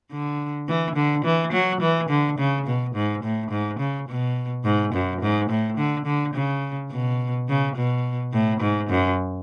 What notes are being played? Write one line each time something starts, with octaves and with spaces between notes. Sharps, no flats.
D3
E3
D3
E3
F#3
E3
D3
C#3
B2
G#2
A2
G#2
C#3
B2
G#2
F#2
G#2
A2
D3
D3
C#3
B2
C#3
B2
A2
G#2
F#2